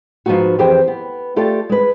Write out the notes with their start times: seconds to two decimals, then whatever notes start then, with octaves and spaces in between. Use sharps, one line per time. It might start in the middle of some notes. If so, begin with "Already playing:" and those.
0.26 G#2 F3 B3 C#4 D#4 F#4
0.59 F2 E3 G4 G#4 C5 G5
0.88 B3
1.36 A3 F4 G4 A4 D5
1.69 G#3 B4